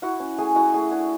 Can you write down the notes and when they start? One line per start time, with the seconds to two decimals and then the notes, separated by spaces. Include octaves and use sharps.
0.02 E4 F#4 F#5
0.20 C#4
0.38 A3 G#4 G#5
0.56 E4 F#4 F#5
0.74 A3 G#4
0.91 D4 G#4